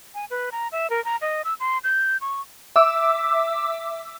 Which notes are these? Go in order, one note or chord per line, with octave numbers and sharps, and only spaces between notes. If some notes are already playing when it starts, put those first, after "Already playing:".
G#5
B4
A#5
E5
A#4
A#5
D#5
E6
C6
G6
C#6
E5 D6 E6